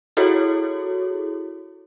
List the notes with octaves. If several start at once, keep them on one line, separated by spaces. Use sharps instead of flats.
E4 F#4 G#4 A4 C#5